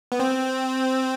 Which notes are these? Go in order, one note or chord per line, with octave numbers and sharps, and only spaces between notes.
B3
C4